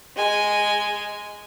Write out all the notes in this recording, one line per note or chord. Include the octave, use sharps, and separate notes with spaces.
G#3 G#5